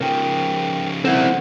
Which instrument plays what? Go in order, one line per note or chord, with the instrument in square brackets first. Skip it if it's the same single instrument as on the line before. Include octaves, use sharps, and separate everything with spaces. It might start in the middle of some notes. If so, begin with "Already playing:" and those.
[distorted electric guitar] C#3 F3 [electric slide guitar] A#4 G5
[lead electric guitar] C4 E4 [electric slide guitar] A4 C5 F#5